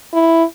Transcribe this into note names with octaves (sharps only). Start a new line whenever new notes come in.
E4